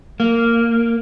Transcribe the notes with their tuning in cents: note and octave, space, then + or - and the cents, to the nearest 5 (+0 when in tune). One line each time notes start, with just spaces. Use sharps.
A#3 -10